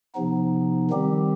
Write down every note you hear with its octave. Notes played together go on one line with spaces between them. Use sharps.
C3 F3 B3 D#4
D#3 G3 C4 G4